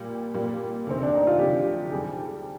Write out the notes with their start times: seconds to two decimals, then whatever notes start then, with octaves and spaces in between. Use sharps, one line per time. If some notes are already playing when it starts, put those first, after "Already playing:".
Already playing: A#2 G3 A#3
0.34 A#2 G3 A#3
0.87 D2 C3 D#3 C4
1.03 D4
1.15 D#4
1.27 F4
1.39 D2 C3 D#3 G4
1.92 F2 D#3 G3 G#4